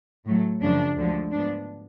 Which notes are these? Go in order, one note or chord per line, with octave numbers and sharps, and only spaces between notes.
A2 F#3 A3
F#2 C#3 F3 D4
D2 D3 F3 G#3
G#2 F3 B3 D4